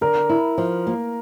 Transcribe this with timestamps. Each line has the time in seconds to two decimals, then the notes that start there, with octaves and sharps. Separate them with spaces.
0.01 D3 A#4
0.29 E4
0.58 F3
0.87 A#3